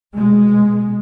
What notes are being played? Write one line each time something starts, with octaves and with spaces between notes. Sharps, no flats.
B2 G#3